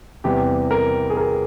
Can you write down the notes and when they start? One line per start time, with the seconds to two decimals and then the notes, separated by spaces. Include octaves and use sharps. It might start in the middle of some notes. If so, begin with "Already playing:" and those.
0.24 E2 C3 G3 G4
0.71 A#4
1.10 G#4
1.17 A#4